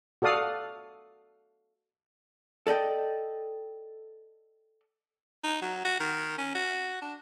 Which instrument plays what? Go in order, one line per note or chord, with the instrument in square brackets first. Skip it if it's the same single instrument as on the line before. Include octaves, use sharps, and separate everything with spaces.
[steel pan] F#4 A4 D5 F5 D#6
[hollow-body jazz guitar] A4 D5 D#5 G5
[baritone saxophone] D#4
F#3
F#4
D#3
C#4
F#4
D4